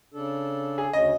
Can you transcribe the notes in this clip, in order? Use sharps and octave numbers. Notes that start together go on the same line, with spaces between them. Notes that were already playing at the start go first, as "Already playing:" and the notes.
C#3 D4 A4
G#4
D2 C#3 C#4 D#5